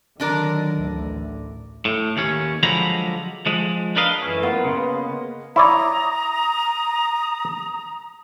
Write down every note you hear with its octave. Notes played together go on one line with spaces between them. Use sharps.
D3 D#3 F#3 D4 A#4
A1 D2
A2
D#2 C#4
D3 F3 F#3 G#3 A#5 B5
F3 G#3
D4 A#4 B4 D#5 F5
F#2 A2 E3 C#4 E4
G#3 A#3 B3 F4
C#3 B4 D#5
E4 C#5 D5 A#5 D#6